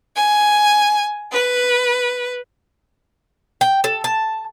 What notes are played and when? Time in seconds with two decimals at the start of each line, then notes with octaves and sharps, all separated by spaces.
0.17 G#5
1.34 B4
3.61 G5
3.84 A4
4.04 A5